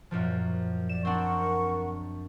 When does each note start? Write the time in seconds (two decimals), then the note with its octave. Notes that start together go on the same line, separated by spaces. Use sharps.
0.11 F#2 A#2 F3
0.89 D5 E7
1.05 C4 D4 A#4 F#5 C#6